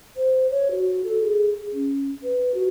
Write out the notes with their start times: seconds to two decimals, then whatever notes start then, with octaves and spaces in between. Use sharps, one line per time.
0.16 C5
0.51 C#5
0.71 F#4
1.04 A4
1.23 G#4
1.73 C#4
2.23 B4
2.54 F#4